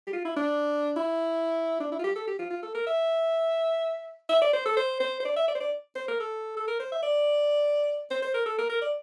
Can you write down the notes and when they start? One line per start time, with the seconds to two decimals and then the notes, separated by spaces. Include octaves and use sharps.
0.07 G4
0.13 F4
0.25 E4
0.36 D4
0.96 E4
1.80 D4
1.92 E4
1.99 F4
2.04 G4
2.16 A4
2.28 G4
2.39 F4
2.50 F4
2.63 A4
2.75 A#4
2.87 E5
4.29 E5
4.42 D5
4.53 C5
4.65 A4
4.77 C5
5.00 C5
5.20 C5
5.25 D5
5.36 E5
5.48 D5
5.55 C5
5.60 D5
5.96 C5
6.08 A#4
6.20 A4
6.57 A4
6.68 A#4
6.80 C5
6.92 E5
7.03 D5
8.11 C5
8.22 C5
8.34 A#4
8.46 A4
8.58 A#4
8.69 A#4
8.82 D5